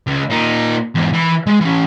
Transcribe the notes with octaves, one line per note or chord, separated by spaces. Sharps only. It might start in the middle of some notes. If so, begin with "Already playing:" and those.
C#2
A#2 D#4
E2 G#2
E3 B5
G#3
E3 C#4